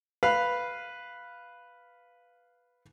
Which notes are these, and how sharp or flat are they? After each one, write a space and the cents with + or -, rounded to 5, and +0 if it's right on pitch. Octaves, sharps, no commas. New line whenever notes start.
B4 +0 F5 +0